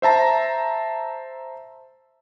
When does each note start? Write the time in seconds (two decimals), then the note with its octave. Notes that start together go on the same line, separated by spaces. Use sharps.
0.02 C5 E5 A5 A#5